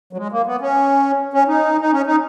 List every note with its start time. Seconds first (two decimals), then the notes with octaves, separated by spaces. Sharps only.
0.13 F#3
0.18 G#3
0.32 A#3
0.46 B3
0.61 C#4
1.33 C#4
1.48 D#4
1.81 D#4
1.92 C#4
2.06 D#4